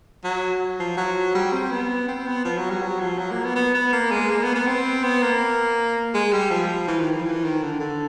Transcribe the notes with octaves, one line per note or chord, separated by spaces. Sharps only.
F#3
F3
F#3
G3
C4
B3
C4
B3
F3
F#3
G3
F#3
F3
F#3
A#3
B3
B3
B3
A#3
G#3
A#3
B3
B3
C4
B3
A#3
G#3
G3
F3
E3
D#3
F3
E3
D#3
D3
D3